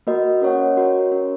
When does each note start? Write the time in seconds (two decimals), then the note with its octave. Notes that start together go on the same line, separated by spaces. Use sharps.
0.07 A#3 F#4 A#4 D#5
0.42 C#4 A#4 C#5 F#5
0.77 F#4 A#4 C#5
1.12 C#4 A#4 C#5